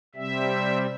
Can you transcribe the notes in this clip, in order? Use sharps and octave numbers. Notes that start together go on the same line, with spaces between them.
C3 G3 C4 E5